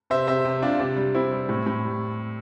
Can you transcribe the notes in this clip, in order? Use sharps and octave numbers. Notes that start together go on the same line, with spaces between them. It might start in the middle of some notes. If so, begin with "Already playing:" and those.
C3 C5 E5
C3 C5 E5
C3
C3 D4 F4
C3 D4
G3
C3 C4 E4
G3
A2
A2
G3